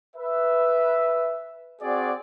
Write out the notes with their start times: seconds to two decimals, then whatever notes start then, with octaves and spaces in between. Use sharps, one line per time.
0.16 B4 E5
1.82 C4 F#4 G#4 D5